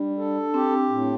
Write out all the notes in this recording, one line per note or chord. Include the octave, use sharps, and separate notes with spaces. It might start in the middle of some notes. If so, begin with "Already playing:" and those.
Already playing: G3 D4
A4
C4 G4
A2